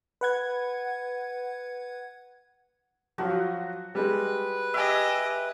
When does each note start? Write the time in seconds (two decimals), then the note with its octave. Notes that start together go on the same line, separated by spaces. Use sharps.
0.21 B4 F#5 G#6
3.18 F3 F#3 F4 F#4
3.95 G3 G#3 B4
4.74 G4 D#5 E5 G#5